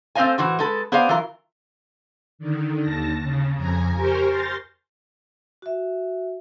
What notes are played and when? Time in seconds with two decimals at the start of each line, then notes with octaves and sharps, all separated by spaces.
0.15 A3 C4 C5 D#5 F5 G#5
0.38 A2 E3 F#4 C5
0.59 G#3 A4 B4
0.92 B3 G#4 C5 D5 D#5 F5
1.09 E3 F#3 F4 A#4
2.39 D3 D#3
2.81 D#2 A5 A#6
3.22 C#3
3.56 F2 G#5 A#5
3.95 G4 A#4 C5 G#5 C#6 F6
4.28 C6 F6 G6 A6 A#6
5.62 F#4 E5